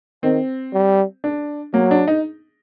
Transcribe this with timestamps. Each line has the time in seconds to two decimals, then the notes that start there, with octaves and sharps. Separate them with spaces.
0.23 D#3 C4
0.73 G3
1.24 D4
1.74 F#3 A#3
1.91 D4
2.07 D#4